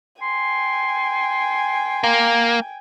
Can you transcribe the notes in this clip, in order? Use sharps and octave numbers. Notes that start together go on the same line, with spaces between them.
G5 G#5 C6
A#3